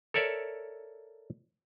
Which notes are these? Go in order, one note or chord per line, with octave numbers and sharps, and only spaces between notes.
A4 A#4 C#5 D5 E5